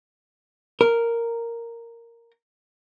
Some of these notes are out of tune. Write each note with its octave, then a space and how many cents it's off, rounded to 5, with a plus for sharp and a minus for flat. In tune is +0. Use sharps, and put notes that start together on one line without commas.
A#4 -5